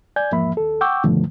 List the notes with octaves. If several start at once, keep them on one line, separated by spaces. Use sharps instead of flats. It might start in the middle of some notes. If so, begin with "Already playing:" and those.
D5 G#5 G6 G#6
E2 G#2 F3 A#3 E5 B5
D#2 A4
F#5 G5 C#6 D6 E6 G6
G2 B2 D3 D#3 F3 A3